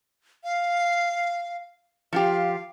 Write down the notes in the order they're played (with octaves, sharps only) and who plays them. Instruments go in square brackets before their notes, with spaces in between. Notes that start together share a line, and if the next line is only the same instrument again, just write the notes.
[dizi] F5
[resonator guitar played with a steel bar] F3 F4 G4 [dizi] F5